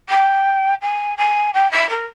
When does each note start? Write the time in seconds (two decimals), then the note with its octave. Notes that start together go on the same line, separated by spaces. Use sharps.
0.09 G5
0.81 G#5
1.17 G#5
1.53 G5
1.71 E5
1.89 A#4